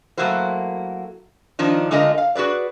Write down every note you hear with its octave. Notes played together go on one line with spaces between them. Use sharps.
F#3 A3 A#3 E4 F#4 C5
D#3 F3 D4 D#4
D3 G#3 A3 F4 A#4 D#5
F5
F#4 G#4 B4 D5